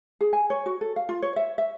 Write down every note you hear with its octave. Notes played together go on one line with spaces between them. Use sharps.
G#4
G#5
C#5
F#4
A4
F5
F4
C#5
E5
E5